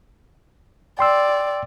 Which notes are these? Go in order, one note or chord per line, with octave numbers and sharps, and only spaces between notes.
D5 G5 C6 E6